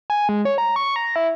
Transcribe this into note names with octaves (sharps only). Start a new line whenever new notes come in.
G#5
G#3
C#5
A#5
C#6
A#5
E4